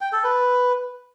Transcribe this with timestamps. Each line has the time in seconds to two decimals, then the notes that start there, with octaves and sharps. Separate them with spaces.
0.01 G5
0.13 A4
0.24 B4